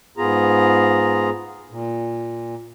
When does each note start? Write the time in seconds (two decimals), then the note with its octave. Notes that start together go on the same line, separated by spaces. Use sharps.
0.18 G#2 B3 F4 G#4 A#5
1.70 A#2